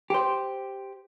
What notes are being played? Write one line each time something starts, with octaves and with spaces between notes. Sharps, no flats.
G4 C5